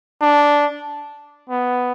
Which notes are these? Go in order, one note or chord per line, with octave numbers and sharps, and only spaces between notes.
D4
B3